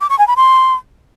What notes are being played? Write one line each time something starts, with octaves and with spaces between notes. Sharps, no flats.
D6
C#6
G#5
B5
C6